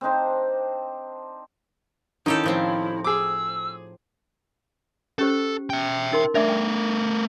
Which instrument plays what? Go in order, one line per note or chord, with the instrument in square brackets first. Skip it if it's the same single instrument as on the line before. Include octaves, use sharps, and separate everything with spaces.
[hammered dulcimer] C4 D4 D#4 C5
[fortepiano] D#3 C#4 [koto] D#4 G4 A4 [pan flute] E4
[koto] A2 F3 C4
[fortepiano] G#4 D6 [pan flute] E6
[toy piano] C#4 G4 C5 [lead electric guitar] A4
[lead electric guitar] E5 G5
[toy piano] D#4 A#4 C6
[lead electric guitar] A3 A#4 [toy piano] D4 D5 E5
[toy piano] G5